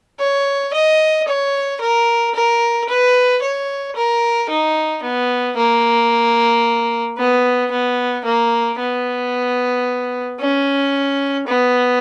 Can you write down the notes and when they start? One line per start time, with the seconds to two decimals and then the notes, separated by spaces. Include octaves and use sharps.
0.20 C#5
0.73 D#5
1.28 C#5
1.81 A#4
2.35 A#4
2.89 B4
3.42 C#5
3.96 A#4
4.49 D#4
5.03 B3
5.57 A#3
7.18 B3
7.71 B3
8.25 A#3
8.79 B3
10.40 C#4
11.47 B3